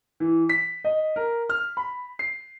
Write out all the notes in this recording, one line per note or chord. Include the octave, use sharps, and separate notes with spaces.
E3
B6
D#5
A#4
F6
B5
C7